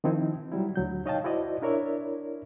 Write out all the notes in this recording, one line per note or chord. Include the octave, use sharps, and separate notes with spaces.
D#3 F3 C4 D#4 E4
F#3 G3 E4
D2 F#3 G6
D#4 C#5 D#5 F5 G5 A5
E4 F#4 C5 D5 D#5
D4 E4 A#4 C#5 D5 E5